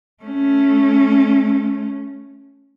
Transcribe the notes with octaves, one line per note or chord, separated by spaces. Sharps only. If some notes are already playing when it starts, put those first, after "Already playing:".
A3 C#4